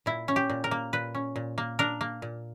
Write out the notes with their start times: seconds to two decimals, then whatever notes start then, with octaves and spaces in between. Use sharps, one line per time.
0.06 A#2 E4
0.28 C#4
0.36 G4
0.50 A#2
0.64 A#4
0.71 A#3
0.93 A#2 B4
1.15 C#4
1.36 A#2
1.58 A#3
1.79 D4 A#4
2.01 A#3
2.22 A#2